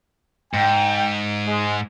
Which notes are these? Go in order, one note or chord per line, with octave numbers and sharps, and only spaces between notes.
G#2 G5
G#3